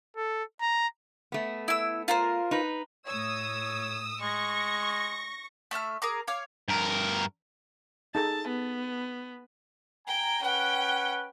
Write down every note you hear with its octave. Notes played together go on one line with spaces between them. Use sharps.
A4
A#5
A3 B3
E4 E6
F4 A#4 C5
D#4 B4
A2 C#5 D#6 E6
G#3 C#6 A#6
A3 E5 A5 F6
G#4 A#4 A#5 D6
C#5 F5 D6
G2 A#4
D#4 G#4 A4 A5
B3
G5 G#5 A#5
C#4 B4 F#5 G5